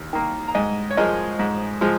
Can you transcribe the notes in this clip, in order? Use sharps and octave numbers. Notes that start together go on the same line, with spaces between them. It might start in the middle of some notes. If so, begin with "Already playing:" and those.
Already playing: D#2
D#3 A#3
A#5
G#2 D#5 G#5
C#5
F3 G#3 A#4 D#5
G#2
F3 G#3